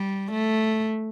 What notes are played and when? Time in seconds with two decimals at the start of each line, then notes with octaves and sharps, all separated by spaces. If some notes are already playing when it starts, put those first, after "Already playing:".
Already playing: G3
0.32 A3